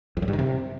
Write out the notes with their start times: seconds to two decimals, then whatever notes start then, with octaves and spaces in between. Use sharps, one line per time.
0.17 F2
0.22 F#2
0.28 G2
0.33 D#3
0.39 C3